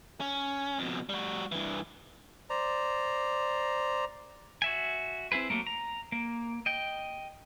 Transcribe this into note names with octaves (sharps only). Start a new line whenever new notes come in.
C#4
F2 B2
G3 F#4
G2 E3
C5 D5 A#5
F#4 E5 G#5
C4 E4 G#4 B4
F#3 A3 A#3
A#5
A#3
D#5 G5